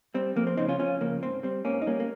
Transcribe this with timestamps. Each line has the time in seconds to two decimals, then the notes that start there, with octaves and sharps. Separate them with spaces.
0.14 G3 C4
0.36 F2 A#3
0.47 C4
0.57 C#3 F3 C4 D#4
0.68 C#4 F4
0.79 F2 C#4 F4
1.01 C#3 F3 A#3
1.22 G#2 C4
1.43 G3 C4
1.65 G#2 A#3 C#4
1.82 D#4
1.87 G3 A#3 C#4
2.00 A#3